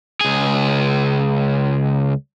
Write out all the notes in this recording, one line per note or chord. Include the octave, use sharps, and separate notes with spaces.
C#2 G#4